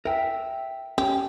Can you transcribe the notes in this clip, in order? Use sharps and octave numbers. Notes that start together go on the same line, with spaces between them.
A#4 E5 G5
C#4 G4